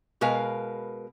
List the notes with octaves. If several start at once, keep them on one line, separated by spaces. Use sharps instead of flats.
B2 G#3 A#4 B4 F5